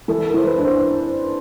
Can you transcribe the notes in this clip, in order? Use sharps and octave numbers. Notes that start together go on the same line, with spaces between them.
E3 A4
A#4
E3 C5
B4
D4
C5